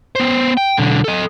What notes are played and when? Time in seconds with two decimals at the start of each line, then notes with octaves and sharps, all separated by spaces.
0.15 B3 C5
0.57 G5
0.78 B1 D3
1.04 A4 D#5